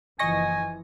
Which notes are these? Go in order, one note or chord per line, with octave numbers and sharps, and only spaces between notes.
F#1 E3 F3 D#5 G#5 C#6 A#6